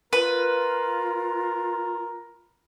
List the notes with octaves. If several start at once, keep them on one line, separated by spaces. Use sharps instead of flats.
F4 A#4 B4